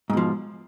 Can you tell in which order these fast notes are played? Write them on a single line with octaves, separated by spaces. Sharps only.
G#2 B2 F3